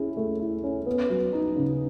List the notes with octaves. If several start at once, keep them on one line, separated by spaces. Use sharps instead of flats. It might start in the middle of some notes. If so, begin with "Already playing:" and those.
Already playing: C#4 E4 G#4
A3
E4
C#4
B3
F#3
D#4
C#3